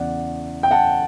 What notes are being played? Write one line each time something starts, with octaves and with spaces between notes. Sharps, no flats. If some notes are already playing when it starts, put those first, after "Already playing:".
Already playing: E2 C#3 E3 D5 F#5
G5
F#5 A5